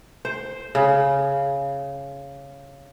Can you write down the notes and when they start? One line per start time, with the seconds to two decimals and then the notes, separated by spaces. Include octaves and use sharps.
0.25 C5
0.75 C#3